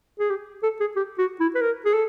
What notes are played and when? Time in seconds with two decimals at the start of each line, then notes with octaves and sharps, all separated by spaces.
0.19 G#4
0.30 G4
0.63 A4
0.80 G#4
0.96 G4
1.18 F#4
1.40 E4
1.55 B4
1.61 A#4
1.85 G#4
1.94 A4